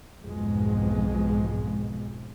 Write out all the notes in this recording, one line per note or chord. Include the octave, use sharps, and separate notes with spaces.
B1 F2 G#2 B2 F3 G#3